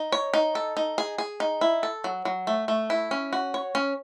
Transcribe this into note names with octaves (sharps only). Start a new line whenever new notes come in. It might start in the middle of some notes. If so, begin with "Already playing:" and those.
Already playing: D#4
C#5
D#4
A4
D#4
G#4
G#4
D#4
E4
A4
F#3
F#3
A3
A3
E4
C#4
F#4
C#5
C#4